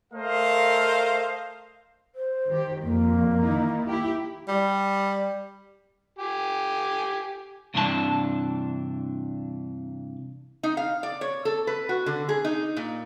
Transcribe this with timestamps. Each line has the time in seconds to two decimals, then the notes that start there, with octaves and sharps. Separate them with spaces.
0.13 A3 A#4 C5 D#5 F5
2.15 C5
2.47 D#3 G4
2.82 F2 A#2 A#3
3.43 D#3 D#4 E4
3.87 E4 G4
4.48 G3
6.19 G4 G#5
7.74 G2 C3 E3 D4 A#4 A5
10.63 D#4
10.77 F5
11.03 D5
11.21 C#5
11.45 A4
11.67 B4
11.89 F#4
12.06 D3
12.29 G#4
12.44 D#4
12.77 A#2